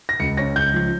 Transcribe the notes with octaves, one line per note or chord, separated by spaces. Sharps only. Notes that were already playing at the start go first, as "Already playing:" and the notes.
A#6
C#2 C#7
C#4 A#6
C#2 G6
F3